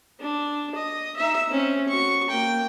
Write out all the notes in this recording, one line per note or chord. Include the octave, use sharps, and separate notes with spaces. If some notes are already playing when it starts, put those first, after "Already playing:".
D4
D#5
D#4 E5
C4 C#4
F#4 C#6
A#3 G5